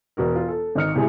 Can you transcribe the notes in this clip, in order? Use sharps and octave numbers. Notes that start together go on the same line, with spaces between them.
E1 F#4 A#4
F4
A4
G#1 D#4 F6 C#7
A2 C3 G#3 G#4